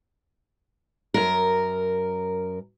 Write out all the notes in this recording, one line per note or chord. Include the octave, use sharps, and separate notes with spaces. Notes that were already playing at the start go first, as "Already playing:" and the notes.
F#2 A#4